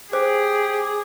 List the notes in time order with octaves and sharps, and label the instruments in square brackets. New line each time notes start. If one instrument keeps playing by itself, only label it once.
[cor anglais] G4 [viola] G#4 [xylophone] C5